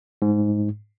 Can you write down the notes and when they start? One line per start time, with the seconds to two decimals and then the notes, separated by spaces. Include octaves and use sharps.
0.22 G#2